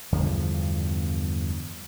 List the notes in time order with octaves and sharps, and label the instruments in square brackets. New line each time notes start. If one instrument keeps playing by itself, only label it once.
[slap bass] E2 G2 D3 F3